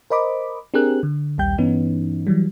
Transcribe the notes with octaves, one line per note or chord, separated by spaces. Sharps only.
A#4 C5 D#5 B5 D6
C4 D4 G4 G#4 A#4 F#6
D3
A#1 D#2 G3 G5 G6
G2 E3 B3 C#4 D#4
E3 F#3 G3